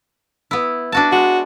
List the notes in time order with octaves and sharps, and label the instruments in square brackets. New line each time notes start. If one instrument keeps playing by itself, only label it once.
[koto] B3 E4
D4 F#4 A5
[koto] G#3 [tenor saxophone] F#4